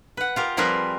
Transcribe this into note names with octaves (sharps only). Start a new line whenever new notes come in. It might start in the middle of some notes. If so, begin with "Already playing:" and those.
B4 F#5
F4 G4 A#4
F3 G3 C4 G#4 A#4 B4